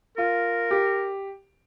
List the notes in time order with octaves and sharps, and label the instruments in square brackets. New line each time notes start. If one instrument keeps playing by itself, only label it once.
[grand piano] F4 [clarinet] A#4
[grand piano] G4